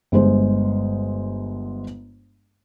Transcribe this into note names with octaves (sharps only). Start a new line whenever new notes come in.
G1 G#3 C5